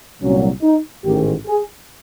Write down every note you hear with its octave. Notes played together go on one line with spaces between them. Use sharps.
C2 A#2 F#3 C#4
D#4
A1 G#2 D#3 G4
G#4